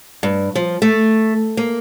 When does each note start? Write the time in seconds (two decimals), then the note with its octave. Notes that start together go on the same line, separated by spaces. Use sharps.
0.23 G2
0.55 F3
0.82 A3
1.57 A#3